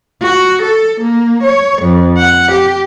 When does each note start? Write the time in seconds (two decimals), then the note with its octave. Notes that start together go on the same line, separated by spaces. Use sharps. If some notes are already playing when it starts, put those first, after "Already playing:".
0.22 F#4
0.62 A4
1.01 A#3
1.43 C#5
1.82 F2
2.18 F#5
2.52 G4